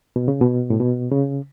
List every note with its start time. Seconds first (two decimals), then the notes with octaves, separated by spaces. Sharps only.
0.16 B2
0.28 C#3
0.41 B2
0.70 A2
0.80 B2
1.12 C#3